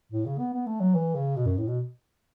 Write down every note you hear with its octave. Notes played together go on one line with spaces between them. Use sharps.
A2
C#3
B3
B3
A3
F#3
E3
C#3
B2
F#2
A2
B2